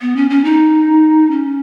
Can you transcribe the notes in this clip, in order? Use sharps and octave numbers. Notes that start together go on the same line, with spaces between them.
B3
C#4
C#4
D#4
C#4